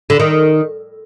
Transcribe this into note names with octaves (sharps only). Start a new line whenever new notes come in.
D3
D#3